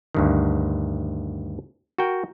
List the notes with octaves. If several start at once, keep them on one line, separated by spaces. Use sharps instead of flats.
D2 G2 D#3
F#4 A#4 G5